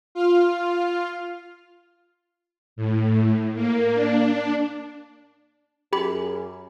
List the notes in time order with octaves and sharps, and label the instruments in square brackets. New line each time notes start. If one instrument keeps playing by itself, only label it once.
[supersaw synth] F4 F6
[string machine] A2
A#3
D4
[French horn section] F#2 G#4 [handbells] G4 B5